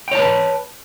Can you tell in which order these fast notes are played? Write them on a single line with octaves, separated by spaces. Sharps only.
G5 C#5 A5 B4